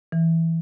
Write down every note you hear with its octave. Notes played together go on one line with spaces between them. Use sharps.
E3